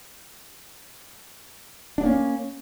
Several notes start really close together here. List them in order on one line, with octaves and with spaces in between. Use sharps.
D4 B3 A#3 C#4